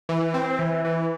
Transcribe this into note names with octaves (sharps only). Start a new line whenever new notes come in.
E3
C4
E3
E3